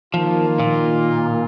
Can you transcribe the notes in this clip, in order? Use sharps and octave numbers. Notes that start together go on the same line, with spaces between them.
D#3 F3 A#3 F4
A#2